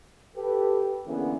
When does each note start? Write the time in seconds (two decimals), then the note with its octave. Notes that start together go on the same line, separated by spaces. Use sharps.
0.36 G4 A4 B4
1.07 D3 E3 A#3 B3 C#4 G#4